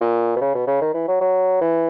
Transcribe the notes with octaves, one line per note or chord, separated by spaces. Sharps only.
A#2
B2
C#3
B2
C#3
D#3
E3
F#3
F#3
E3